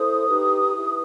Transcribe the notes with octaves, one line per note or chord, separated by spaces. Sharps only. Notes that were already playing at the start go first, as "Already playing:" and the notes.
Already playing: E4 A4 C5 D#6
D#4 G4 B4
E4 G4 B4